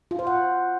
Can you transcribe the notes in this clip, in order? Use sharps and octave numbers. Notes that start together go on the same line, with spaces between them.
F4
C5
F#5